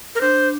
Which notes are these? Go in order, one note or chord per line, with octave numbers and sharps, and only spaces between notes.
A#4
D4 C5